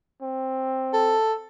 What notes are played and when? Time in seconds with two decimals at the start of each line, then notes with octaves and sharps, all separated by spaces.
0.22 C4
0.93 A4